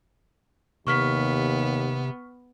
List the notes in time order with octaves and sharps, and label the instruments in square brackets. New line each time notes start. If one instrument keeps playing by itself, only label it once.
[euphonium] D#2 [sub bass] C3 [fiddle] B3 [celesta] C#6 F6 B6